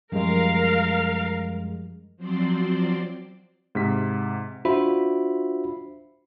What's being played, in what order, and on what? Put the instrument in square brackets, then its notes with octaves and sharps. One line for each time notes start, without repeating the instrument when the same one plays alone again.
[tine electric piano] F#2 G#3 [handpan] F3 G3 [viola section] A#4 F5
[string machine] F3 F#3 C4 C5 D5
[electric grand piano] G#2 C3 B6
[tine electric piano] D4 F4 F#4 C5 E5 B5